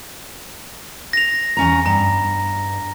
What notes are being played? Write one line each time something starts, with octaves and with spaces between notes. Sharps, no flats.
A#6 F7
E2 C#4 A#5
G2 A#5